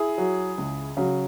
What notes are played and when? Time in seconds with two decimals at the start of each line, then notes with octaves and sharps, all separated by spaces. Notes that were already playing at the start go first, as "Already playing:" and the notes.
Already playing: E4 G#4
0.18 F#3
0.58 C#2
0.97 C#3 F#3